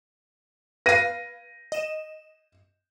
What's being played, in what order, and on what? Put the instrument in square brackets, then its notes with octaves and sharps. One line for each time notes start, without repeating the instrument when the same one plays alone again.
[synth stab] B4 F5 [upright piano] A#6 D#7
[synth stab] D#5 E7